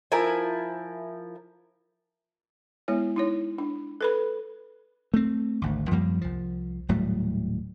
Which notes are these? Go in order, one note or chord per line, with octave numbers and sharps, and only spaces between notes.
F3 E4 A#4 G#5
G#3 B3 E4 C#5
D#4 E4 C#5
D4
A4 B4 B5
A3 C4
G#1 D2
F#2 F3 G3 A#3
C2 F3
D#1 A2 F#3 G3